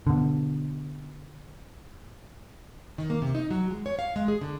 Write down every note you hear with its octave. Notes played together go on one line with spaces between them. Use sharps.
B2 D3
D#3
A#3
C3
D#4
F#3
G#3
C#5
F5
G#3
G#4
D3